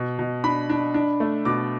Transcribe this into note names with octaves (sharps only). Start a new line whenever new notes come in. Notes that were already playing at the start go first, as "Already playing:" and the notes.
Already playing: B2
B2
D4 B5
D4
D4
A3
B2 D6